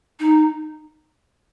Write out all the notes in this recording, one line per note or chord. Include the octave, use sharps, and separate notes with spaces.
D#4